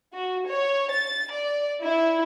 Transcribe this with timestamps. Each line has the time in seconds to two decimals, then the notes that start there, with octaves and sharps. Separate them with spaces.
0.14 F#4
0.47 C#5
0.92 A6
1.32 D5
1.82 E4